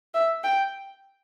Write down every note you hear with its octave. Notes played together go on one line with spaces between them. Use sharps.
E5
G5